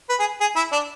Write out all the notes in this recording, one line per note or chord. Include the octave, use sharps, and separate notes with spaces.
B4
G#4
G#4
E4
D4